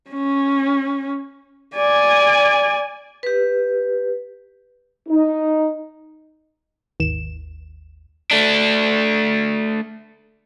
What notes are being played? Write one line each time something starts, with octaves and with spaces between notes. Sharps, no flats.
C#4
D5 G#5
G4 B4
D#4
G#1 D#2 E7
A3 D4